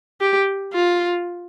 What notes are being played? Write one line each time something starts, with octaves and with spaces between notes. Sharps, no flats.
G4
F4